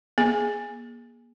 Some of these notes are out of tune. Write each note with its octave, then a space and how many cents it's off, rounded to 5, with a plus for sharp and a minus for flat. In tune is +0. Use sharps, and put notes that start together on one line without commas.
A#3 +35 G#4 +0